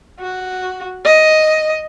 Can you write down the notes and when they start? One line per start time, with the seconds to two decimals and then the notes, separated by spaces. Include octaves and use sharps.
0.20 F#4
1.05 D#5